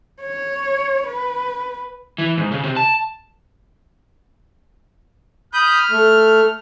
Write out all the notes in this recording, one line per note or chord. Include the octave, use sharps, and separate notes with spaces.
C#5
B4
E3
G#2
C#3
C3
A5
B5 D#6 F6 G6
A3